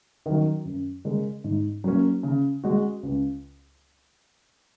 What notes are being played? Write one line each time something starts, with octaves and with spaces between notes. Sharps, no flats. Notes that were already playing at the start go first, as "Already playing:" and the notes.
D#3 F#3
F#2
C#3 G#3 C#4 A#4
G#2
F#3 A#3 C#4
C#3
G#3 F#4
C#2